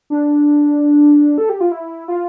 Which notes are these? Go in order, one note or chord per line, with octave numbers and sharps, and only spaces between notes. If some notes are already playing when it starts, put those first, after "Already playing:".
D4
A4
G4
F4
E4
F4